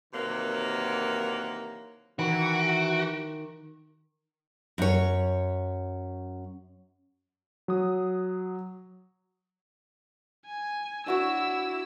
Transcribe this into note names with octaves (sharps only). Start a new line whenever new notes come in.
C3 D#3 E3 F#3 A#3
D#3 E3 F#4 D7
F#2 C#5
F#3 D#6
G#5
D4 E4 F#4 C#5 E6